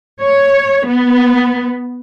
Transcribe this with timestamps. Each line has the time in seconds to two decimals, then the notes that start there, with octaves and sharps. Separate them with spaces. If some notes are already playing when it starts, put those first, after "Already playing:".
0.21 C#5
0.87 B3